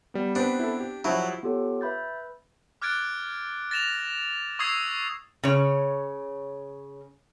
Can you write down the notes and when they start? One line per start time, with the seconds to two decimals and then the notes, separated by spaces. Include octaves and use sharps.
0.14 G3 B3
0.35 B3 C4 D4 G4 B4
0.59 E4 A4
0.80 G4
1.05 F3 F#3 E4
1.43 B3 F4 G4 A4 C#5
1.81 B4 E5 B5 G6 A6
2.82 D6 F6 F#6 G#6 A6 D7
3.71 A6 A#6 E7 F7
4.59 C#6 D#6 E6 G#6 C7 F7
5.43 C#3 C#5